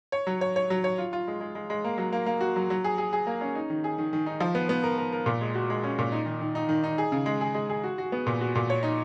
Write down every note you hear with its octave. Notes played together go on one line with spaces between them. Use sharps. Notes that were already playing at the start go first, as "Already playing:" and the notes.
C#5
F#3
C#5
C#5
F#3
C#5
F4
F4
G#3
G#3
G#3
G#3
A#3
F#3
A#3
A#3
F#4
F#3
F#3
G#4
G#4
G#4
A#3
C#4
D#4
D#3
G#4
D#3
D#3
D#4
F3
B3
B3
A#4
A#4
A#4
A#2
G#3
F#4
G#3
C#4
A#2
D#4
D#3
D#3
D#4
D#3
D#4
G#4
C#3
G#3
G#4
G#3
G#4
F#4
F#4
B3
A#2
F#4
A#2
C#5
D#4